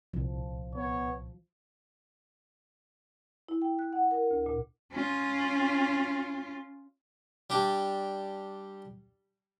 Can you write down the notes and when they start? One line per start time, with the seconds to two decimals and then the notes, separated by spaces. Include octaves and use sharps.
0.14 C2 A#2 F3
0.75 B3 C#5
3.48 E4
3.62 G5
3.79 F#6
3.93 F#5
4.11 A#4
4.31 D2
4.46 A#2
4.92 C#4 F4
7.50 G3 D4 G4